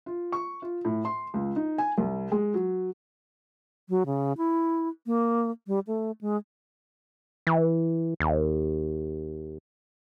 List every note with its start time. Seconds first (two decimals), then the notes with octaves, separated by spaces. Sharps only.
0.06 F4
0.32 C#6
0.62 F4
0.85 A2
1.05 C6
1.34 C#2
1.56 D#4
1.78 G#5
1.98 C2
2.32 G#3
2.54 F#3
3.89 F#3
4.06 C#3
4.37 E4
5.06 A#3
5.67 G3
5.87 A3
6.21 G#3
7.47 E3
8.20 D#2